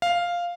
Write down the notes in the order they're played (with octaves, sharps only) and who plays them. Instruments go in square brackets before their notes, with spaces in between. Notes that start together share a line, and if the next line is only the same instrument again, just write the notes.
[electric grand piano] F5